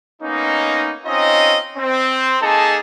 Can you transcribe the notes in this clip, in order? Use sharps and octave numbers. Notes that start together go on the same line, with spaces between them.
A#3 B3 C#4 D#4
C4 C#4 D#4 F4 D#5
C4
A#3 D#4 G#4 A4 D#5 A5